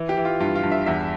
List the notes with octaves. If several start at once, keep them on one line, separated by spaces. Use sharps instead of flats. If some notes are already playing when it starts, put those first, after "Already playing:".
Already playing: E3
G4
E3
F4
G2 F4
F4
G2
E5
E2 E5